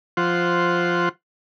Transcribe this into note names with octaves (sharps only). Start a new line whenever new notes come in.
F3 F4 C5 F#5